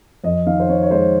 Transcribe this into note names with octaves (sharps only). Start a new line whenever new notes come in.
F2 D#5
D#3 F5
C5
C4 C#5
C#5
G#3 C5